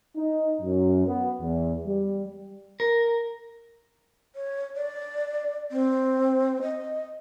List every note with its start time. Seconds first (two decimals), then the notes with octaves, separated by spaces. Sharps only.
0.16 D#4
0.61 F#2
1.06 B3
1.41 E2
1.86 G3
2.80 A#4
4.36 C#5
4.76 D5
5.71 C4
6.62 D#5